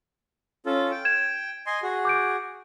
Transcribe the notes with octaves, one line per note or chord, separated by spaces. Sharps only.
C#4 F4 A4
G5
G#6 E7
D#5 G#5 C6
F#4 G#4
D6 G6 D7